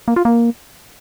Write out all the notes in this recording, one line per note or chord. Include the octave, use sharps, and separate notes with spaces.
A#3
F4
A#3